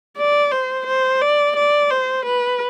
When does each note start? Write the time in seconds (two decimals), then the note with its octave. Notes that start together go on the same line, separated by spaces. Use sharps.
0.17 D5
0.52 C5
0.86 C5
1.21 D5
1.56 D5
1.91 C5
2.26 B4